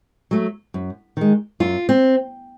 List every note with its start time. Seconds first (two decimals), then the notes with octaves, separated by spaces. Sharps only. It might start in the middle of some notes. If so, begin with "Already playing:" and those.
0.31 F#3 A3
0.74 F#2
1.17 D#3 G#3
1.60 F#2 F4
1.89 C4